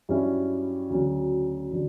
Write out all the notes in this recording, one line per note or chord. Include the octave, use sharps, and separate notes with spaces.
G2 F#3 C#4 E4
D2 C#3 F#3
D3 F#3